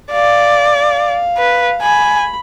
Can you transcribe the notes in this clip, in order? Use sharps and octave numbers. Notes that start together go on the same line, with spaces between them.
D5 F5
F5
B4
G#5 B5